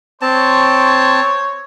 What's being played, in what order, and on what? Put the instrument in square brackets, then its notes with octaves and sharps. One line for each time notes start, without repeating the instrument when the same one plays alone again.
[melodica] C4 A5 [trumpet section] C5 C#5